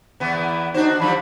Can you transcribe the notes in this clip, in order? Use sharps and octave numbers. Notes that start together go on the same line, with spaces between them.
E2 E3 B3
D4 D#4 F#4 C5
E3 F3 G3 B5